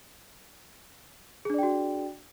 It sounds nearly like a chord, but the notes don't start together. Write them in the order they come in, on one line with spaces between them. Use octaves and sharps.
G#4 D4 D5 G5 F#4